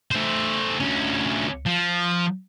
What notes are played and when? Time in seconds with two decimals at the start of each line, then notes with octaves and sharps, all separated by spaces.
0.11 A3 C5
0.80 D2 C#4
1.66 F3